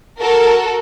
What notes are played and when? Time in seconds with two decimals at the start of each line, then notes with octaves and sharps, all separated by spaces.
0.19 F#4 A4 A#4